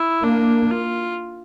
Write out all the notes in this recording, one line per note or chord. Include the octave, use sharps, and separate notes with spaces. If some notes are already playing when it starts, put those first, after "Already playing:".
Already playing: E4
A#3 D4
F4